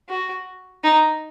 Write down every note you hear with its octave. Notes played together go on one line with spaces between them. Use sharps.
F#4
D#4